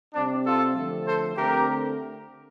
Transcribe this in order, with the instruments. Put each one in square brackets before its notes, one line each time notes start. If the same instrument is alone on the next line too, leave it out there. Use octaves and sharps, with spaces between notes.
[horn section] C3 G3 C4 D4
F4 A4
D3 F3 A3
A4 C5
D3 A3 C4 G4 A#4